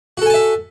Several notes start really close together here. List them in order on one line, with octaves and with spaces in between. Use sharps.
F#4 A4 G#5 A5 E5